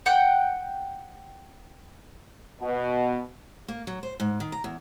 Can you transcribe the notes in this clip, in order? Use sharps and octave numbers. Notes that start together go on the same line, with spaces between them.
F#5 G5 F#6
B2
A#3
F#3
C5
G#2
D#3
A#5
E2